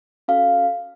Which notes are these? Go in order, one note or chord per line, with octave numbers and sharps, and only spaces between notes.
C#4 F#4 A4 F5